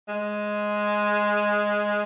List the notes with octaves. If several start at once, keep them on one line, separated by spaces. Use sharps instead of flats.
G#3